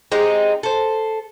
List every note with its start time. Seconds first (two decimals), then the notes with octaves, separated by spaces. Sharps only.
0.12 G#3 C4 D#4 G4
0.63 A4 C5